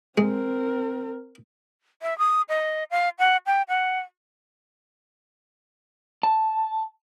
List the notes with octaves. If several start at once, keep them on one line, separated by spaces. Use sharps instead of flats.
G#3 C4 A#4
E5
D#6
D#5
F5
F#5
G5
F#5
A5